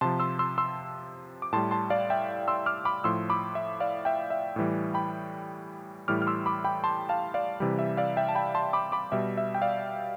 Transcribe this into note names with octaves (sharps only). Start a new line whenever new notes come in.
C3 F3 A5 C6
C6 E6
C6 E6
C6 E6
D6
A2 G3 A5 C6
A5 C6
D5 F5
E5 G5
C6 E6
D6 F6
B5 D6
A2 F3 C6 E6
B5 D6
E5
D5 F5
E5 G5
E5
A2 E3 G3
G5 B5
A2 E3 G3 D6 F6
F6
C6 E6
B5 D6
G5 B5
A5 C6
F5 A5
D5 F5
C3 E3 G3
E5
D5 F5
E5 G5
A5
G5 B5
A5 C6
B5 D6
B5 D6
B2 G3 E5
E5
G5
D5 F5